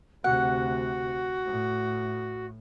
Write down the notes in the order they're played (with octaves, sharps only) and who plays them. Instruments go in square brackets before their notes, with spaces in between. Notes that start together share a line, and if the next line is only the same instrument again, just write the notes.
[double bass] D2 C3 [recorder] F#4 [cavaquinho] F#5
[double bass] A2